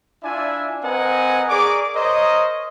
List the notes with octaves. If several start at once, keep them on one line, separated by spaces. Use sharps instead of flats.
D4 E4 F4 D5 E5 G#5
C4 A#4 B4 D#5 F#5 G#5
G#4 A#4 D5 C#6 D6
A#4 C5 C#5 D#5